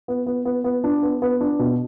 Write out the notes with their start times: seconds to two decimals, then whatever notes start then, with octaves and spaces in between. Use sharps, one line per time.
0.08 B3
0.26 B3
0.45 B3
0.64 B3
0.84 D4
1.03 B3
1.22 B3
1.41 D4
1.59 B2